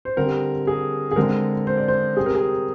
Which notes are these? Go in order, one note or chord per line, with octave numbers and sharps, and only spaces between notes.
C5
D3 G3 C4 A#4
G#4
G#4
D3 G#3 C4 A#4
C5
D5
C5
C3 G3 C4 G#4
A#4
G#4